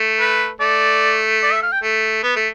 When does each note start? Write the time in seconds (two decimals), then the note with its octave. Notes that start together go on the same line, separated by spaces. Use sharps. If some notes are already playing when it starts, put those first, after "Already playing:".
Already playing: A3
0.20 B4
0.60 A3 D5
1.43 D5
1.52 E5
1.62 F5
1.72 G5
1.83 A3
2.23 B3
2.36 A3